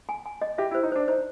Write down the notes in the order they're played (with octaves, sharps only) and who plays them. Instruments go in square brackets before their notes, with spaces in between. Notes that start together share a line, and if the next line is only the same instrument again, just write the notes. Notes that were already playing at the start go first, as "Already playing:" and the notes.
[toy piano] G#5
G#5
D#5
[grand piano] G4 [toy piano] E5
[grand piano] E4
[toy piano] C5
[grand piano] D#4
[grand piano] D4 [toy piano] C5
[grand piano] D#4 [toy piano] C5